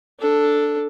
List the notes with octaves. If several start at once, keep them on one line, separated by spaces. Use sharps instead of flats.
D4 A4